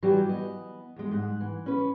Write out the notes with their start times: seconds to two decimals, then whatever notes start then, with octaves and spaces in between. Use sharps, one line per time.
0.03 E3 F#3 G3 F#4 G4
0.29 B3 D#5
0.96 E2 G#3
1.11 G#2 F#5
1.41 E3
1.66 C#4 B4